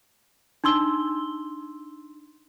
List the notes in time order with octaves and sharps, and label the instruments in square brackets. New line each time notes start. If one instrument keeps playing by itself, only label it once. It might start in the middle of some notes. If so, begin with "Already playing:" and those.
[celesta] D4 D#4 C6 E6 G7